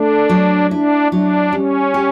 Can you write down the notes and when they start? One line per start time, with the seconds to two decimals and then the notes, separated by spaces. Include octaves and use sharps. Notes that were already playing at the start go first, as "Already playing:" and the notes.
Already playing: A3 D4
0.29 F#3
0.70 D4 E4
1.12 F#3 D4
1.52 G3 C#4
1.94 G4